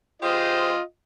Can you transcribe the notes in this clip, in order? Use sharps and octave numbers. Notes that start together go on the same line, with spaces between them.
F4 G4 G#4 C5 D#5